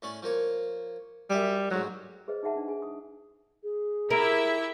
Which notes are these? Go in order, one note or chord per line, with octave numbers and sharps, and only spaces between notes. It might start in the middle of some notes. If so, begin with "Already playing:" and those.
A2 C#4 D5
F3 A#3 C#5
F#2 G3 E5 G#5
D2 G#2 F#3
G#4 B4 C5 D#5
D#4 G#4 E5 F#5 A5
D4 D#4
G#4 G#5
D#6
G#4
E4 G4 A#4 E5